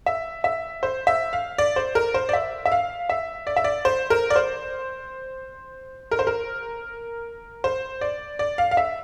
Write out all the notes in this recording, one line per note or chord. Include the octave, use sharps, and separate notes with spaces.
E5
E5
C5
E5
F5
D5
C5
A#4
C5
D5
E5
E5
F5
E5
D5
E5
D5
C5
A#4
D5
C5
A#4
C5
A#4
C5
D5
D5
F5
F5
E5